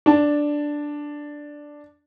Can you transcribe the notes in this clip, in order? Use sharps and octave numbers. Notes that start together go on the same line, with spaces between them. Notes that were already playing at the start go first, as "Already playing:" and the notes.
D4 A5